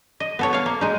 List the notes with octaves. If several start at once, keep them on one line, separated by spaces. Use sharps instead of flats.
D#5
B3 A4 C#5
C#5 F5
A#3
G#3 D#4